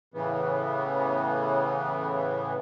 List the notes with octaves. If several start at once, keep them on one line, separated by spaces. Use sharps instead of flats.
A2 C#3 E3 B3